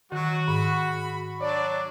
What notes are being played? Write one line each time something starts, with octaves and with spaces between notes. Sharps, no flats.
D#3 F#3 F#4
G#2 B5
F#3 D4 C#5 D5